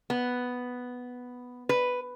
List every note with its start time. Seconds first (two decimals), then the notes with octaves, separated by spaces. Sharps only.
0.10 B3
1.69 B4